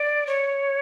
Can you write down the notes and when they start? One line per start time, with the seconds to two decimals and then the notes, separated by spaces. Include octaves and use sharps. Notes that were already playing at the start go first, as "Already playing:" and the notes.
Already playing: D5
0.27 C#5